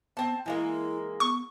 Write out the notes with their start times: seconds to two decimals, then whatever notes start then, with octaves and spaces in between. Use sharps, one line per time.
0.17 B3 C4 A5
0.46 E3 G#3 A#3 E4
1.20 B3 C#6